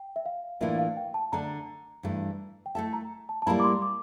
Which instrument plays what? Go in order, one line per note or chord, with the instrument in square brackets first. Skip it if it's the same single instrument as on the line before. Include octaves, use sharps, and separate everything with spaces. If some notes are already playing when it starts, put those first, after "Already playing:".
Already playing: [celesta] G5
E5
F5
[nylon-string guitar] A2 E3 A#3 D4 F4 [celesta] E5
[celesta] F5
G5
A5
[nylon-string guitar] D3 A3 D4 [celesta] A#5
[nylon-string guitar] G2 E3 A3
[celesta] G5
[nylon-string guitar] A3 E4 A4 E5 [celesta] A5
[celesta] A#5
A5
A5
[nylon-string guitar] A2 G3 A#3 E4 [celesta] A#5
[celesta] D6
C6
D6